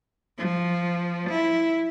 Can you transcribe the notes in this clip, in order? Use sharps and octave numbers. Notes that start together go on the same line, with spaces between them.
F3
E4